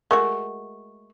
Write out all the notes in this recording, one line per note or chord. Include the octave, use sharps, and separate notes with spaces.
G#3 A3 F#4 A#4 C#6